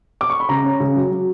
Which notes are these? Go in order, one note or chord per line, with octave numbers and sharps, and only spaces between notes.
D6
C#6
B5
C#3 A#5
C#4
C#3
F#3
F#3